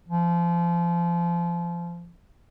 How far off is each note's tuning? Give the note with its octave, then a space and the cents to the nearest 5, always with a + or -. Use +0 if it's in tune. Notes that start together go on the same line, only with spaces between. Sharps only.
F3 -25